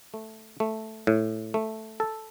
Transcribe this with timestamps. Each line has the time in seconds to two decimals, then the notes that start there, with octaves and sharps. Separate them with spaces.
0.14 A3
0.60 A3
1.07 A2
1.54 A3
2.00 A4